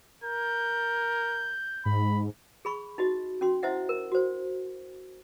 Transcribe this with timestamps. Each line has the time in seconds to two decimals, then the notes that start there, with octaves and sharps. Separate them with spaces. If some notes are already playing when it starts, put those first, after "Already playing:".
0.24 A#4 G6
1.85 G#2 B5
2.65 G#4 B5 C#6
2.98 D#4 F#4 D#5
3.41 C#4 F#4 C6
3.63 E4 C5 D#5 E5 F#5
3.89 A#4
4.12 F#4 C5